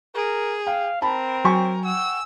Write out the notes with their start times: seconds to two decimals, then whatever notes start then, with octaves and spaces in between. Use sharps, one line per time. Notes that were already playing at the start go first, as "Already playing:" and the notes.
0.15 G#4 A#4
0.67 F5 G5
1.02 C4 A#4 A5 B5
1.45 F#3 G5 G#5 C#6
1.85 F#5 E6